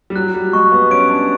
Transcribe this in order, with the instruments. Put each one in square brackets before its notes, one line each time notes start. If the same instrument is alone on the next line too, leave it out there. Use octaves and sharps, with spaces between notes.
[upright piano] G3
[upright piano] F#3 [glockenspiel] F#6
[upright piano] G3
[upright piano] G#3 [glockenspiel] C#6
[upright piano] B3
[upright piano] C#4 [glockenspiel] D7
[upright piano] D4